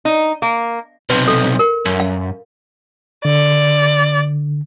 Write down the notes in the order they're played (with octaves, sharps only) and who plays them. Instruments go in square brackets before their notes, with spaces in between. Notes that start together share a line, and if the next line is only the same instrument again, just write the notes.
[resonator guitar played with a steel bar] D#4
A#3
[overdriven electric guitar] B1 C3 [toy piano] B4
[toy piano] A4
A#4
[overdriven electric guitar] F#2
[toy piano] F5
[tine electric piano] D3 [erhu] D5